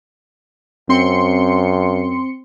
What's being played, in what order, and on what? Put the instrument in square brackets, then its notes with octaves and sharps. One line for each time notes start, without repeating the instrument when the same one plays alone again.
[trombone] F#2 [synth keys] C4 C6 C#7